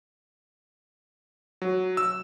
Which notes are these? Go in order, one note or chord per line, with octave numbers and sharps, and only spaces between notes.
F#3
E6